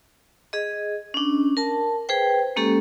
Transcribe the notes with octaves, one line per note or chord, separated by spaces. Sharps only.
G#4 D#5
C#4 D4
A#4 A5
G#4 B4 C5 G5
G#3 A#3 C#4 G4 A4